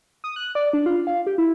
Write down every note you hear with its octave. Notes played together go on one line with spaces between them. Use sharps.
D#6
F#6
D5
D4
F4
F5
G4
E4